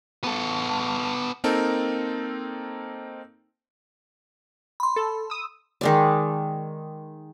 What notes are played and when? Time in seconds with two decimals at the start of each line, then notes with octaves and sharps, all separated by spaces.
0.24 B3 A4
1.44 A#3 C4 D#4 A4 A#4
4.80 B5 C6
4.96 A4
5.30 D#6 E6
5.81 D#3 G#3 D5